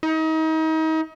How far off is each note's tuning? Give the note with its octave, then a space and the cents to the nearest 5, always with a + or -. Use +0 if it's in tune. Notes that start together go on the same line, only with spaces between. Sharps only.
D#4 +35